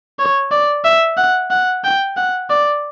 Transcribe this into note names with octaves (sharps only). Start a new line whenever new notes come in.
C#5
D5
E5
F#5
F#5
G5
F#5
D5